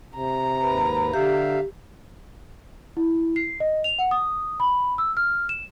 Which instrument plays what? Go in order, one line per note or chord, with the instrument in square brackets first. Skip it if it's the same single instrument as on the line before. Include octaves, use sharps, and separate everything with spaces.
[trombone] C3 [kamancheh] A#5
[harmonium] D#2 G#2 B4
[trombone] D3 [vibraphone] G4 [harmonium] E5 F5
[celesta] E4
C7
D#5
F7
F#5
D#6
B5
E6
F6
E7